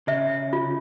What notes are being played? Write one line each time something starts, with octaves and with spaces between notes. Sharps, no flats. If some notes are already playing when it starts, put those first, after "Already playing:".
C#3 E5
F4